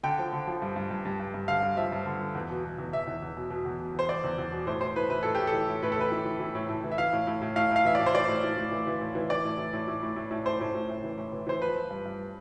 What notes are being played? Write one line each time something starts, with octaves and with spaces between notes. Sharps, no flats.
D3 G5
F3
D3
F3
G2
G2
G2
G2
G2
G2
D3 F5
G2
F3 E5
G2
D3
D3
E2
B2
B2
E2
E2 E5
E2
E2
B2
B2
E2
B2
E2 C5
E2 D5
E2
E2
B2
A2 C5
E3 C5
A2 B4
E3 B4
A2 A4
G4
A2
A4
E3
A2
A2 B4
A4
E3 B4
E3
E3
E3
A2
A2
E3
E5
E3 F5
A2
A2
A2
A2 F5
A2 F5
E3 E5
A2 D5
C5
E3 D5
A2
A2
A2
E3
E3
A2
E3
E3 D5
A2
E3
A2
A2
A2
A2
A2
A2 C5
A2
A2
A2
E3
A2
E3
E3 C5
F3 B4
F3
G2
G2